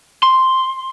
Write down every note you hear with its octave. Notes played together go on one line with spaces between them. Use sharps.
C6